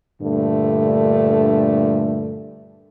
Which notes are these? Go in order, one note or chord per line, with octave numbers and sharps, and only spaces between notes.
G2 A#2 D3 A3